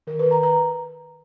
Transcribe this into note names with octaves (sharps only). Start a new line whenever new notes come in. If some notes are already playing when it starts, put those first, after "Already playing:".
D#3 A#4
B4
D#3
A#5
D#3 A#5